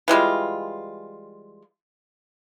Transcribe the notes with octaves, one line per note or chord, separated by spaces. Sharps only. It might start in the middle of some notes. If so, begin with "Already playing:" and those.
E3 G3 G#3 F4